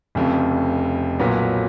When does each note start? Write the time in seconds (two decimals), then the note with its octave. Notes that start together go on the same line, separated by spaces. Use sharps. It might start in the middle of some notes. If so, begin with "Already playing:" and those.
0.15 F1 F2 C#3
1.19 B1 A#2 F#3 B3